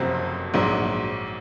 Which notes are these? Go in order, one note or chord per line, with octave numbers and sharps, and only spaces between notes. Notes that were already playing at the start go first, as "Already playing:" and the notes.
Already playing: F#1 F2 C3 F#3 C4
A#1 G#2 F#3